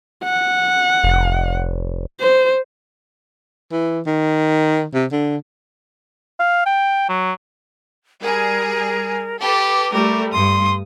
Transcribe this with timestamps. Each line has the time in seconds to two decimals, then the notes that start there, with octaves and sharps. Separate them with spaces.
0.24 F#5
1.04 F1
2.21 C5
3.72 E3
4.06 D#3
4.94 C3
5.12 D3
6.40 F5
6.66 G5
7.09 F#3
8.23 G3 G#4 A#4
9.41 G4 A4 B4 D6
9.94 G3 A3 A#4 D6
10.33 G2 C6 D#6